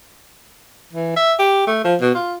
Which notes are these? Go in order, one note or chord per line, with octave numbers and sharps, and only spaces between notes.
E3
E5
G4
A3
F3
B2
F4